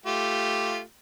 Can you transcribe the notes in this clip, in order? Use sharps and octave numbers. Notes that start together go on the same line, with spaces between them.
A3 F4 G4